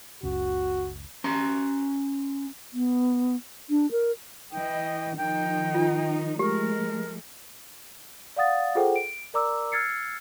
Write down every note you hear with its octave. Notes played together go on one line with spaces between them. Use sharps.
F#1 C#2 C#3 F#4
C#4 A#5 C6
B3
D4
A#4
E3 D#5 G5
D#3 F3 D#4 G5
F4
F3 G#3 A3 G4 A#4
D5 F5 F#5 D#6 A6
F4 G#4 A4 C5 F#5 G5
D7
A#4 D5 A#5 D6 E6
E6 F6 G#6 A6 C7 C#7